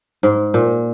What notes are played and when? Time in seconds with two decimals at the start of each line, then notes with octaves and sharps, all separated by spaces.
0.23 G#2
0.54 A#2